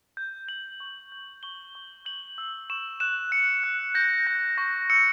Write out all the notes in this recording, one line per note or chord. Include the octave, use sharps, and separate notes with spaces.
G6
G6 F#7
C#6
G6
C#6 G7
C#6
G6 F#7
E6
C#6 E7
F#6 E7
F#6 C#7
F#6
G6 A#6
G6 A#6
C#6 A#6
E6 C#7